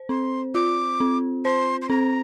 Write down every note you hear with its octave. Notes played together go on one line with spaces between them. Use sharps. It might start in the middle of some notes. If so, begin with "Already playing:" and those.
Already playing: C5
C4 C6
F4 D6
C4
C5 C6
C6
C4 A#5